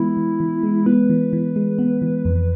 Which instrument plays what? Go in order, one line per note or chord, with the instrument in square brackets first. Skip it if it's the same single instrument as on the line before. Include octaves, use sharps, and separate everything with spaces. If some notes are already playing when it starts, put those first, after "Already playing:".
Already playing: [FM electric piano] E3 G#3 B3 [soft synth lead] E4
[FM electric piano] E3
E3
G#3
[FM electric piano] B3 [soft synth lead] B4
[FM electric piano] E3
E3
G#3
B3
E3
F2